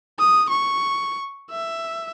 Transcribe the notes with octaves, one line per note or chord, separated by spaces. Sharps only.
D#6
C#6
E5